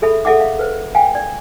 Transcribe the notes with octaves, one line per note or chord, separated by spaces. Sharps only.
G#4 A4 E5 B5
G#4 A4 E5 F#5 D6
F5
B4 C5
F5 G5 G#5
D5